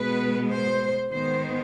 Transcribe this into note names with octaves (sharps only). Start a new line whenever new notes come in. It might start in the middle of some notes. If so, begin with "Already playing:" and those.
Already playing: B2 G#3 B3 B4
C5
D#3 G#3 B3 C5